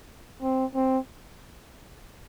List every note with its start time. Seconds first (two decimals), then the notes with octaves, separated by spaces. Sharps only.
0.42 C4
0.75 C4